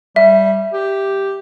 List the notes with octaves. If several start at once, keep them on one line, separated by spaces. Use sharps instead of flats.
G3 E5
G4